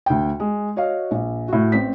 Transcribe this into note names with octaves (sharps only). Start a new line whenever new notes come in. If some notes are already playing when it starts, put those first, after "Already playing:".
D2 G5
G#3
F#4 C#5 D#5 F5
A#1
A2 F#4
A1 C4 B6